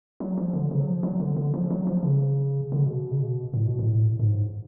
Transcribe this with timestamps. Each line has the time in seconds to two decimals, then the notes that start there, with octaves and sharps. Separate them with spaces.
0.20 F#3
0.38 F3
0.53 D3
0.71 C#3
0.80 F#3
0.88 F3
1.03 F#3
1.20 D3
1.37 D3
1.54 F3
1.70 F#3
1.87 F3
2.03 C#3
2.72 D3
2.78 C#3
2.86 B2
3.11 C#3
3.20 B2
3.54 A2
3.67 B2
3.79 A2
4.19 G#2